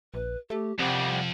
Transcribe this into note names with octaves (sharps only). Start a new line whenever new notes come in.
A#1 B4
A3 G4
C2 F2 C3 G3 F#5